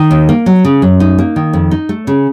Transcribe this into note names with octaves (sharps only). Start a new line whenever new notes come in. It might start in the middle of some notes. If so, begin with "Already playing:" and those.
Already playing: D#3
D#2
A#3
F#3
C#3
F#2
D#4
A#3
D#3
F2
D#4
A3
C#3